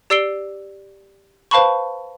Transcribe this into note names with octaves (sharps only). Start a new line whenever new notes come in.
G4 D5 E6 C7 D7 G7
B4 C5 F5 A5 B5 C#6